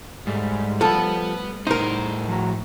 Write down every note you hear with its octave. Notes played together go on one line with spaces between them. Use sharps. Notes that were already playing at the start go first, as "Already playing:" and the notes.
G#2 G3 A3
F3 B3 A4 B4
A2 D#4 A#4 C5
F3 F#4 A#5